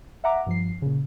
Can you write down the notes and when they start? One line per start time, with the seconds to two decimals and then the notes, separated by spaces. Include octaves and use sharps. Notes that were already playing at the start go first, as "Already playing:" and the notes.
0.24 E5 F#5 A#5 D6
0.46 G2 F3 C7
0.82 A#2 C#3